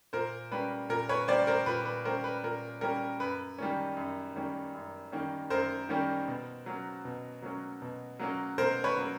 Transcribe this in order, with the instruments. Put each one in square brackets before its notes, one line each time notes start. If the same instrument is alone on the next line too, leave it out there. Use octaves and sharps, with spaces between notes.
[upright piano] A#2 A#4 C5
G3 A#3 C#4 B4
A#2 A#4
B4 C#5
G3 A#3 C#4 C5 D5
A#4 C5
A#2 B4
B4
G3 A#3 C#4 A#4 C5
B4
A#2 A#4
G3 A#3 C#4 A#4
F#2 B4
D#3 G3 A#3 C#4
F#2
D#3 G3 A#3 C#4
F#2
D#3 G3 A#3 C#4
F#2 A#4 C5
D#3 G3 A#3 C#4
B2
F#3 A#3 C#4
B2
F#3 A#3 C#4
B2
F#3 A#3 C#4
B2 A#4 C5
B4 C#5
F#3 A#3 C#4